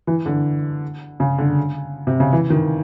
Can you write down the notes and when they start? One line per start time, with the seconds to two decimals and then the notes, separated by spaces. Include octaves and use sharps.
0.07 E3
0.26 D3
1.20 C#3
1.38 D3
2.07 C3
2.20 C#3
2.33 E3
2.50 D#3